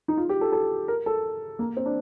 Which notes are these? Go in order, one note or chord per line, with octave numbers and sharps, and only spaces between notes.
D#4
F4
G4
A4
A4
A#4
A4
A#3
C4
D4